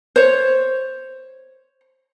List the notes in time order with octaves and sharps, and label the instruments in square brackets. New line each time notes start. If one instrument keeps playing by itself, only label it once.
[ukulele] C5 C#5